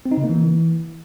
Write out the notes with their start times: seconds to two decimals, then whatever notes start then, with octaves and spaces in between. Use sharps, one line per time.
0.06 C4
0.12 D#4
0.17 C#3
0.23 A#3
0.29 E3